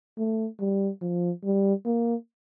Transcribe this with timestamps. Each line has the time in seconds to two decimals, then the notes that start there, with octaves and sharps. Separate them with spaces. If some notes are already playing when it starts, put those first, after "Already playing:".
0.18 A3
0.60 G3
1.01 F3
1.44 G3
1.86 A#3